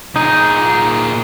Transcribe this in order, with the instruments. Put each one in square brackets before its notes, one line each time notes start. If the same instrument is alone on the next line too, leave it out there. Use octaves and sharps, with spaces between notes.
[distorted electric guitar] A#2 G#4 [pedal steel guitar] D#4